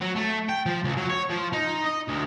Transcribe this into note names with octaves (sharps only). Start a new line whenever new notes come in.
F#3
A3
G5
F3
C#2
F#3
C#5
F3
D#4
D#5
D2